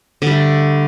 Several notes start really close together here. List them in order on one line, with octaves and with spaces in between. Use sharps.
D3 G3 A3